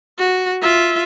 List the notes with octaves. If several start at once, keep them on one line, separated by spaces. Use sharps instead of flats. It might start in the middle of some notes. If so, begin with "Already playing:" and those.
F#4
F4 E5